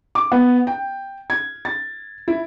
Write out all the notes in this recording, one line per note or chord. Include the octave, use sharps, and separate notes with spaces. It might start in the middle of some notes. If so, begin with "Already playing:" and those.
D6
B3
G5
G#6
A6
E4